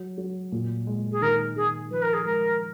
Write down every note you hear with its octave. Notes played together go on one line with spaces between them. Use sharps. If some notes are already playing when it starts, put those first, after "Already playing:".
Already playing: F#3
F#3
A#2
G#3
G#4
D#3 A#4
D#3 G#4
F3 B4
A#4
G#4
G#3 A#4